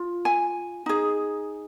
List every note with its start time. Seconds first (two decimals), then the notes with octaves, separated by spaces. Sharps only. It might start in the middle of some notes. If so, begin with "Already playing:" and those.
Already playing: F4
0.25 G#5
0.86 D#4 G#4